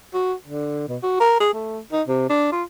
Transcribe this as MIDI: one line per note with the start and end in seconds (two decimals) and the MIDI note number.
0.14 0.33 66
0.45 0.84 50
0.88 0.97 47
1.03 1.15 66
1.20 1.35 70
1.40 1.52 68
1.53 1.80 57
1.92 2.02 63
2.08 2.28 48
2.30 2.50 62
2.52 2.63 65